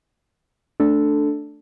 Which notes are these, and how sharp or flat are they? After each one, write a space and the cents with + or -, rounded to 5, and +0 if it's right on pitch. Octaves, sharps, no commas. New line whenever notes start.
A3 +0 D4 +0 A4 +0